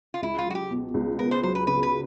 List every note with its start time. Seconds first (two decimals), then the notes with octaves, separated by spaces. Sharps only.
0.14 F4
0.22 C#2 E4
0.38 F4
0.46 F#3 F#4
0.55 G4
0.71 B2
0.94 C#2
1.18 B3 A#4
1.31 C5
1.43 F#3 C5
1.55 B4
1.67 C#3 B4
1.83 B4